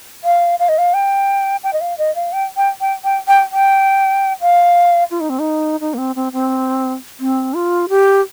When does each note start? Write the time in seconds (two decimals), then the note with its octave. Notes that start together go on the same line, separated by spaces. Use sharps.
0.24 F5
0.60 F5
0.69 D#5
0.78 F5
0.94 G5
1.64 G5
1.73 D#5
1.81 F5
1.98 D#5
2.16 F5
2.33 G5
2.57 G5
2.81 G5
3.04 G5
3.28 G5
3.52 G5
4.41 F5
5.11 F4
5.20 D#4
5.30 C4
5.39 D#4
5.80 D#4
5.94 A#3
5.98 C4
6.16 C4
6.33 C4
7.20 C4
7.54 F4
7.89 G4